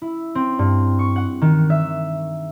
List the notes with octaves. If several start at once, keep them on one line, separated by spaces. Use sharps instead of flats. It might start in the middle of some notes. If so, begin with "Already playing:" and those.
E4
C4
G2
C#6
F#5
D#3
E5